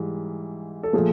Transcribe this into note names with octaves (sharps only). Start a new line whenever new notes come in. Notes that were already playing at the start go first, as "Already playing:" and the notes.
Already playing: G#2 E3 G3
A4
A#2 F3 A3 G#4